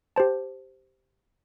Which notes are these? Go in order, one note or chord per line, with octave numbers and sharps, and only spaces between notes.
G4 C5 A5